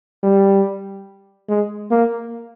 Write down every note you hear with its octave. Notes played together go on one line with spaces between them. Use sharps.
G3
G#3
A#3